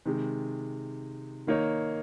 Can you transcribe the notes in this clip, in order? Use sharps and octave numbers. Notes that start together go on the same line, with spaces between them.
C3 D#3 G#3
D#3 A#3 D#4 A#4 C#5